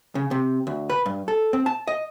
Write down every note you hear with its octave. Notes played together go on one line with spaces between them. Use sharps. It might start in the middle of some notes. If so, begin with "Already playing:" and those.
C#3
C3
D2
B4
G2
A4
C4
A5
D#5